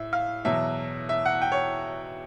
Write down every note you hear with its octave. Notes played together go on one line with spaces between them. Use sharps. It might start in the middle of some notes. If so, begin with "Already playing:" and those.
Already playing: A2 E5
F5
E2 B2 F#3 E5
E5
F#5
G5
C#5